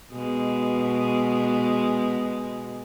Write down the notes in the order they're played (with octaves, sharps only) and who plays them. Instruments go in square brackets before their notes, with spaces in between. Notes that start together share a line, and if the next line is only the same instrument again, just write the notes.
[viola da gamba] B2 G#3